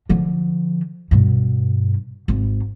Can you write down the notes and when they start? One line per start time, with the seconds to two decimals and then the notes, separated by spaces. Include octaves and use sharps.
0.09 D3 F3
1.11 G2 B2
2.28 G#1